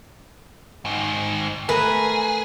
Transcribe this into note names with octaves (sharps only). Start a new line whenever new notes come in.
G#2 D#3
A3 G#4 A#4 B4